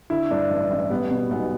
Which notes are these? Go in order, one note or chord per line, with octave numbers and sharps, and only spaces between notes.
D3 E4
G2 D4
A1
A1
G3 B3
B2
B1 B3